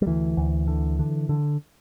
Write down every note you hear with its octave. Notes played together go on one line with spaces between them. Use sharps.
G3
D2 E3
D2
D3
D3
D3